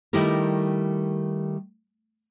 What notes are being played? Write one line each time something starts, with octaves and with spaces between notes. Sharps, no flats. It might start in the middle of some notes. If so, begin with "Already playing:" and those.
D#3 G3 A3 E4 G4 A#4